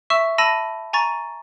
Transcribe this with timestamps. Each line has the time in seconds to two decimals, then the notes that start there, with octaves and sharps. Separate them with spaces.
0.10 E5 C#6 E6 E7
0.38 A5 B5 E6 A#6 D#7
0.93 G#5 A#5 C#6 A6